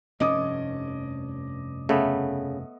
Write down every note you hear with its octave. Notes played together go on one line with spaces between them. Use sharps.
F1 G2 C#4 D#5 D6 D#6
C#3 A3 B3